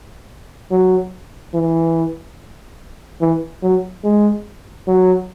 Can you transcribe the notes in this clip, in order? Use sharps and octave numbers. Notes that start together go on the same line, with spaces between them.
F#3
E3
E3
F#3
G#3
F#3